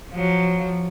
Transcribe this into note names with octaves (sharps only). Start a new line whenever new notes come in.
F3 F#3